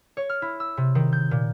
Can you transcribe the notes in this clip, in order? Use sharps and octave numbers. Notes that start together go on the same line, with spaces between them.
C#5
F6
E4
E6
C3
D#3
G6
A#2